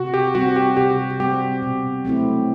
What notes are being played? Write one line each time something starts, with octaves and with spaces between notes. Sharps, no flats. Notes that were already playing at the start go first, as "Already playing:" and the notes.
Already playing: C3 F#4
G4
G3 C4 F#4
G4
C3 G4
G3 C4 G4
B2
F#3 A3 C4 E4